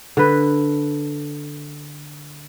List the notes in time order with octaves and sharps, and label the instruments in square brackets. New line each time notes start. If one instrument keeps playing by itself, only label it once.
[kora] D3 B4